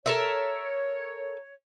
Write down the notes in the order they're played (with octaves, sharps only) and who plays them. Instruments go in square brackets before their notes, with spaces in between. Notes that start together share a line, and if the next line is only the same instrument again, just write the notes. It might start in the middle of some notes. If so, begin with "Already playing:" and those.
[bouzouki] A4 A#4 E5 [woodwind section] C#5